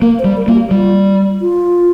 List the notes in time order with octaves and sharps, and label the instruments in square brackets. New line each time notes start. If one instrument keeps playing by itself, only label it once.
[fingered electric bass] A#3 [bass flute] A#4
[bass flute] C5
[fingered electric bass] G3
[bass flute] A#4
[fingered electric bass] A#3 [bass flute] F4
[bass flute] G4
[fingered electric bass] G3 [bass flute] F4
[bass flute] F4